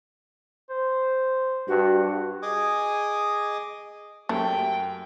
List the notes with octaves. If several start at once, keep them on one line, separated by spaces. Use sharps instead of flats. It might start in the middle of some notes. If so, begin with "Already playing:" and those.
C5
G2 F#4
G#4 D#5 G#5 D6 D#6
F#2 A3 G4 G5